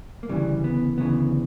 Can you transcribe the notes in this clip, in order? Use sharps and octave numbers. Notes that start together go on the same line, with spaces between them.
A#3
D2 C#3 E3 G3
B3
D2 C#3 E3 B3